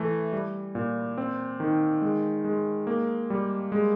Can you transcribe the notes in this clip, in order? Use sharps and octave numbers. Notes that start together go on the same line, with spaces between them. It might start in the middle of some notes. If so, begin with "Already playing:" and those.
Already playing: E3 A3
G3
A#2
C4
D#3
G#3
G#3
A#3
G3
G#3